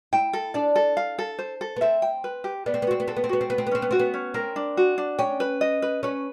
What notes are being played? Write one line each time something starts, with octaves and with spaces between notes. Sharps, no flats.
E4 G5
A4
D4 D5
A4
F5
A4
C5
A4
B3
C4 E5
G5
B4
G4
B3 D5
C4
B3
C4 F#4
B3
C4 A4
B3
C4
B3 F#4
C4
B3 B4
C4
B3
C4 C#4
B3
C4 F#4
B3
C#4
C4 A#4
D4
F#4
D4
C#4 G5
B4
D#5
B4
C#4 B4